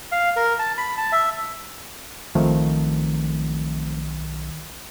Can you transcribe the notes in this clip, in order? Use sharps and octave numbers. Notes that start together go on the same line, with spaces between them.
F5
A#4
A5
B5
A5
E5
B1 D#3 F3 A3 C4